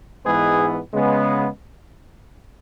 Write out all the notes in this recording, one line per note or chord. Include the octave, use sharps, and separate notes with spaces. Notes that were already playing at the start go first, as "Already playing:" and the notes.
G#2 E3 G#3 B3 G#4 B4
C#3 G#3 B3